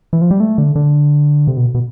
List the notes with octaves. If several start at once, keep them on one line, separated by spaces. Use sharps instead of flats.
E3
F3
G3
A3
D3
D3
C3
B2
B2